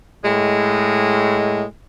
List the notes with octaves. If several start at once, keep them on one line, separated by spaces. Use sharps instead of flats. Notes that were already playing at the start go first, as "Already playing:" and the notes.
A2 G#3